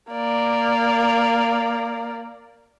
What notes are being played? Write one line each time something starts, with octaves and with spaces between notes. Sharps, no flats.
A#3 D5